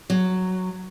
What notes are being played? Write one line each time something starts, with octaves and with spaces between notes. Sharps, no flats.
F#3